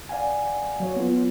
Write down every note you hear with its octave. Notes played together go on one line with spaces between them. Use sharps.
D5 F5 F#5 G#5
F#3 C#5
B3 F4